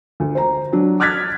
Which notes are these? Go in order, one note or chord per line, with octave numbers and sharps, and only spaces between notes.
D2
C5 A#5
F#3 D4
D6 F6 F#6 G#6 A6 B6